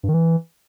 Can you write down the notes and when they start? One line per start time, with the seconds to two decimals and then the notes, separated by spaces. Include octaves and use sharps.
0.03 G2
0.09 D#3
0.14 E3